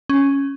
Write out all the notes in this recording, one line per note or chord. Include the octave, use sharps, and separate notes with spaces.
C#4